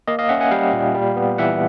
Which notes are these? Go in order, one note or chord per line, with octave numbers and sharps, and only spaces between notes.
A#3 D#5 F5
D#5 F5
C#4 E5 F#5
F#5 G#5
G3 F5 G5
A#2
G3
B3
E3 E5 F#5